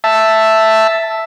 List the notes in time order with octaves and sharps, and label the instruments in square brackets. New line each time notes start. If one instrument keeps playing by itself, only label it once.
[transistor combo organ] E5 A5